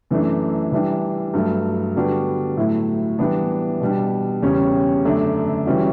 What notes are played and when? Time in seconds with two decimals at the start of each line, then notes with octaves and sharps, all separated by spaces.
0.11 F#2 E3 A3 D4
0.72 E3 G3 D4
1.34 G2 F#3 A3
1.96 D3 G3 B3 D4 F#4
2.57 A2 F#3 A3 E4
3.19 E3 G3 B3 D4
3.81 B2 G3 D4
4.42 E2 C#3 G3 C#4 G4
5.04 F#2 D3 A3 D4
5.66 E3 G3 C#4 F#4